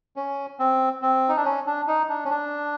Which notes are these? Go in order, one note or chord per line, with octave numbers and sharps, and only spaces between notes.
C#4
C4
C4
D#4
D4
C#4
D4
D#4
D4
C#4
D4